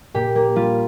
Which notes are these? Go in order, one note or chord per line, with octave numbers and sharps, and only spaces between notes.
A#2 G4
A#3
G3 F4